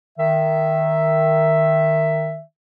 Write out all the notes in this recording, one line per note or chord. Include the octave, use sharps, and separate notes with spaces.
D#3 E5